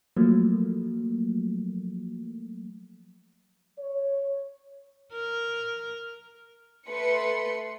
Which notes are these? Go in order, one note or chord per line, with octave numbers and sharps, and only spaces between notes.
F3 F#3 A3 A#3
C#5
A#4
A3 B4 C6 C#7